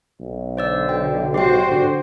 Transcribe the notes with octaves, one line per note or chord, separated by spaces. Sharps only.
B1
D3 C5 D5 E6
G5
F#4 G4 C5 G5
D3